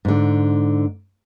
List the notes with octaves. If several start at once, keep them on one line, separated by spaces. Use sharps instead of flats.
G#2 D3